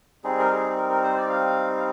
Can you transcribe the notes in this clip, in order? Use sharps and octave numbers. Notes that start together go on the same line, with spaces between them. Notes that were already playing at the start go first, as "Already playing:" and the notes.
G3 C4 D#4 G#4
A#4
G#4
A#4
A#4
C5
D5
F5
F5